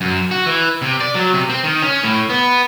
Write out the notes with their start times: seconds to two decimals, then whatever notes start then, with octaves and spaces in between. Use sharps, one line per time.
0.01 F#2
0.31 F#4
0.46 E3
0.82 C3
1.00 D5
1.15 F#3
1.33 C3
1.49 C4
1.64 D#3
1.82 C#4
2.04 A2
2.29 B3